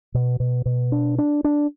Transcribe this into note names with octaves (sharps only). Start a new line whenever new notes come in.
B2
B2
B2
D4
D4
D4